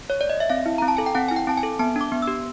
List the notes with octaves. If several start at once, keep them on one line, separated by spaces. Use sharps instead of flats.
C#5
D5
D#5
E5
C4 F5
E4
C4 A#5
A5
A4 G#5
G5
C4 F#5
E4 G#5
G5
C4 A5
G#5
A4
B3 A5
D4 D6
B3
E6
G4